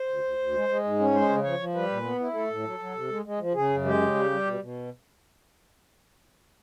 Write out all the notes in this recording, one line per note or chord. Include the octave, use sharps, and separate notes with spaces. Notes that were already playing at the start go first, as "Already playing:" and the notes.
Already playing: C5
D2
D2
D2
G#3
G#3
G#2
C#4
G#3 C5
C#3
F3 C#5
F3
G3 B4
A#2
B3
E4
A3 A4
A2
F#3
F#3
C3
G#3
G#3
F3
C#3 G#4
F#2
G#3 G4
C#3
G3
G3
B2
B2